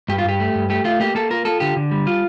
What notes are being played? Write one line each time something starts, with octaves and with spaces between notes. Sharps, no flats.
G2 G4
F4
G2 G4
A3
G2
A3 G4
A3 F4
A#3 G4
A#3 A4
F4 A#4
F4 A4
D3 G4
D3
G3
F4